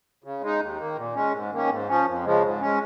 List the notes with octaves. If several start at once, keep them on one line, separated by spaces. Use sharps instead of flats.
C#3
G#3 D#4
D#2
D#3 A#3
A#2
G#3 C#4
G#2
D#3 A#3 C#4
G#2
F3 C#4
F2
C#3 F3 G#3
G#2
G#3 C#4